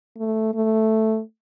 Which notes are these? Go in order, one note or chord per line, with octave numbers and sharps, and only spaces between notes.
A3
A3